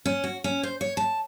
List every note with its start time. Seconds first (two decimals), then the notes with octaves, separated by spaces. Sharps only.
0.05 C#4
0.24 F#4
0.44 C#4
0.63 C5
0.81 C#5
0.97 A5